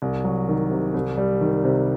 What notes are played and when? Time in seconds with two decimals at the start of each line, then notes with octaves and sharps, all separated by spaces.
0.02 C2
0.24 F#3
0.49 D#3
0.71 C3
0.94 C2
1.18 G3
1.41 D#3
1.64 C3